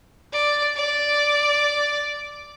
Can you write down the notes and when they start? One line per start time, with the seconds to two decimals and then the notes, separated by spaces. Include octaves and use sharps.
0.33 D5
0.76 D5